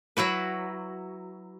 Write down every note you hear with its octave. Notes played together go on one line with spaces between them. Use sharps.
F#3 E4 F#4 B4